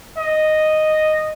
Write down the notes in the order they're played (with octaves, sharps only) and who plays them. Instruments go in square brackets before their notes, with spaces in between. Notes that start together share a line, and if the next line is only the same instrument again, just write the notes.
[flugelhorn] D#5